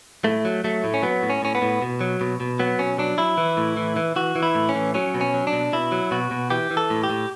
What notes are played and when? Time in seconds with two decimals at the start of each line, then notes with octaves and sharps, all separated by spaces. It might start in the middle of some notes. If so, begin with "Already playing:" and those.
0.24 A2 A3
0.45 F#3
0.64 F#3 A3
0.84 A2
0.94 C#4
1.02 F#3 B3
1.22 A2
1.30 C#4
1.42 A2 C#4
1.55 B3
1.62 A2
1.82 B2
2.01 F#3
2.21 B2
2.40 B2
2.59 F#3 B3
2.79 B2 C#4
2.98 F#3 D4
3.18 F#3 E4
3.38 E3
3.57 A2
3.77 E3
3.96 E3
4.16 E3 F#4
4.36 E3
4.42 E4
4.55 A2
4.69 C#4
4.75 E3
4.94 F#3 C#4
5.14 B2
5.21 C#4
5.34 F#3
5.47 D4
5.53 B2
5.73 B2 E4
5.92 F#3
6.11 B2 F#4
6.31 B2
6.50 E3 G4
6.71 E3
6.77 A4
6.90 A2
7.03 G4
7.10 A2